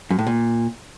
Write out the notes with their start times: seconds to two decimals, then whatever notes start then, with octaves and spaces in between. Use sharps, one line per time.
0.10 F#2
0.19 A2
0.27 A#2